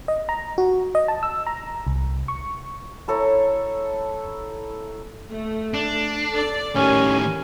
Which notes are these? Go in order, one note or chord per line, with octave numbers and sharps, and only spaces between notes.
D#5
A#5
F#4
D#5
A5
E6
A#5
C2
C#6
E4 A4 C#5 A#5
A3
D4
A4 D5
A2 D#3 C#4 G4 A#4 G#5